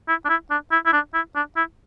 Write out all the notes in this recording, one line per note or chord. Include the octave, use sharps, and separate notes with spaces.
E4
D4
E4
D4
E4
E4
D4
E4
D4
E4